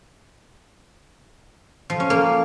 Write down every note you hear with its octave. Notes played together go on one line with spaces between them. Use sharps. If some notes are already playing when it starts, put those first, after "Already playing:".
F3
C#4
A#3